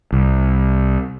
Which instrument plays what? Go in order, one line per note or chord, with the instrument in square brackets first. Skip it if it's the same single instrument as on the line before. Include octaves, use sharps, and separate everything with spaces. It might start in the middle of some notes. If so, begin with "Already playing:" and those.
[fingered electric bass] C2